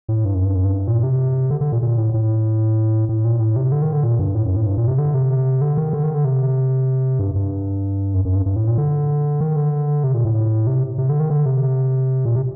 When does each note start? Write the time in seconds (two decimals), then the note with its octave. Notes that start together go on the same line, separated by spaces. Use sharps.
0.09 A2
0.25 G2
0.35 F#2
0.45 G2
0.55 F#2
0.65 G2
0.87 A#2
1.03 C3
1.50 D3
1.61 D3
1.72 A#2
1.83 A#2
1.98 A2
2.14 A2
3.09 A2
3.25 A#2
3.40 A2
3.56 C3
3.72 D3
3.82 D#3
3.93 D3
4.04 A#2
4.19 G2
4.35 A2
4.45 F#2
4.56 A2
4.66 G2
4.77 A#2
4.88 C3
4.98 D3
5.14 C3
5.61 D3
5.77 D#3
5.93 D3
6.03 D#3
6.14 D3
6.25 C3
7.19 G2
7.35 G2
8.14 F#2
8.25 F#2
8.35 G2
8.46 G2
8.56 A2
8.67 A#2
8.78 D3
9.41 D#3
9.56 D3
10.04 C3
10.14 A#2
10.25 A2
10.67 C3
10.98 C3
11.09 D3
11.20 D#3
11.30 D3
11.46 C3
12.25 A#2
12.36 C3